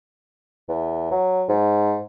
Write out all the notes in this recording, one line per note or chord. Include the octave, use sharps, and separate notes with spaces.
E2
F#3
G#2